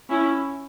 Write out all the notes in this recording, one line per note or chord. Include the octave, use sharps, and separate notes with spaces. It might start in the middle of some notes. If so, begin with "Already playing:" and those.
C#4 E4